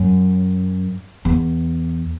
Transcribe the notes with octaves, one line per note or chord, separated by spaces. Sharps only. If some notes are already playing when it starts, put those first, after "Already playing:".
Already playing: F#2
E2